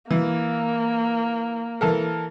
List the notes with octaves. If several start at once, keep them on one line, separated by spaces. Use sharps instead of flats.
E3 A#3
E3 A4 A#4